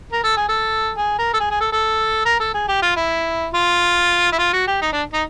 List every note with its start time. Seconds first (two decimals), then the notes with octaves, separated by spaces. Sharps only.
0.12 A#4
0.23 A4
0.37 G#4
0.48 A4
0.97 G#4
1.19 A#4
1.34 A4
1.40 G#4
1.50 G#4
1.60 A4
1.72 A4
2.25 A#4
2.40 A4
2.54 G#4
2.68 G4
2.82 F4
2.96 E4
3.54 F4
4.32 E4
4.38 F4
4.53 F#4
4.67 G4
4.81 D#4
4.92 D4
5.13 D#4